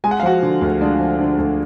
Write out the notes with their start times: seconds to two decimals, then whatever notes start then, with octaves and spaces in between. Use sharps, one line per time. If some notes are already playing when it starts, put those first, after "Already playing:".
0.04 G#3 G#5
0.11 F#5
0.20 F5
0.23 F3 F#4 F#5
0.43 D3
0.61 D2
0.81 G#3 D4 D5
1.00 F3
1.19 D3
1.39 D2